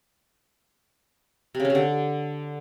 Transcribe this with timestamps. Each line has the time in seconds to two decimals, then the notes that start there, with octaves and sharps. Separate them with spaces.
1.55 C3
1.60 C#3
1.65 C#4
1.70 C3
1.75 D3